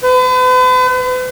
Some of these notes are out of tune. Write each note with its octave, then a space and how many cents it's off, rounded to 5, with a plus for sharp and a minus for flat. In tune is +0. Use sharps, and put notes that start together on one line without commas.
B4 +45